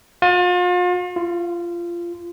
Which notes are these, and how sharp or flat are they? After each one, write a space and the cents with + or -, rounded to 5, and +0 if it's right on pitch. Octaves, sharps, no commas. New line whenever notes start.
F4 +40
F4 -20